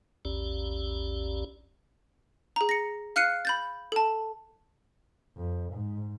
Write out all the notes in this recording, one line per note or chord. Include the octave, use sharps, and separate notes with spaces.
A#1 E2 C#4 G4 D5
G#4 A#5
A#6 C#7
F5 F6 F#6 C7 C#7 D#7
B5 G6 A6
A4 A5
F2
G#2